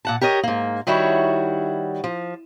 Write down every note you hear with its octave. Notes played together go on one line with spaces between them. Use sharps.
A#2 F#5 A5
G4 A#4 C#5 D#5
G#2 A#3
D#3 G3 E4 F#4 C#5
F3